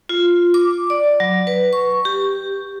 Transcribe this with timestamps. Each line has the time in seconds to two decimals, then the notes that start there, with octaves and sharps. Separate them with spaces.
0.09 F4
0.54 D6
0.90 D5
1.20 F#3
1.47 B4
1.73 C#6
2.05 G4